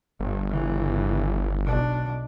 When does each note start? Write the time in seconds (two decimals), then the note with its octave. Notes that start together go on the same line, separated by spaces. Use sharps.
0.20 G1 G2
0.50 C#3 E3
1.65 B1 D4